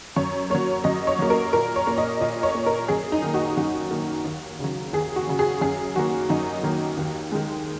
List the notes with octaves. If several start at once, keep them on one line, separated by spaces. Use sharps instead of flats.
F#2 C#5
F#3 A#3 C#5
F#2 D#5
C#5
F#3 A#3
A#4
A#2 A#4
C#5
A#3
D#5
A#2 D#5
C#5
A#3
A#4
F#2 G#4
D#4
D#3 A#3
F#4
F#2 F#4
D#3 A#3
D#2
C#3 F#3
D#2 G#4
F#4
C#3 F#3
G#4
F#2 G#4
D#3 F#3 A#3 F#4
F#2 D#4
D#3 F#3 A#3
D#2
D#3 G#3